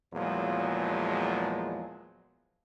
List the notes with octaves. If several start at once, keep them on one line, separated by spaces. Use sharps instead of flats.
E2 A#2 F3 F#3 G#3